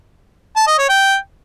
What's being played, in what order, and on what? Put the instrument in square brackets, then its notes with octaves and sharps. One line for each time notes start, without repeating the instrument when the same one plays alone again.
[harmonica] A5
D#5
C#5
G5